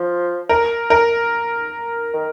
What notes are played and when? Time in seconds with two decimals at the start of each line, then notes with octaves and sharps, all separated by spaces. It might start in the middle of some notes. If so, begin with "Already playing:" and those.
Already playing: F3
0.49 A#4
0.90 A#4
2.14 D#3